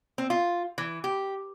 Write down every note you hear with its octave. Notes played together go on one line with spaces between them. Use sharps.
C4
F4
E3
G4